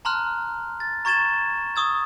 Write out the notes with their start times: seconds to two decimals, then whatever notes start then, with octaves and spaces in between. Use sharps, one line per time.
0.05 A5 A#5 C6 F6 F#6
0.80 A6
1.05 A#5 C#6 G#6 A6 E7 G7
1.76 C#6 D#6 E6 G#6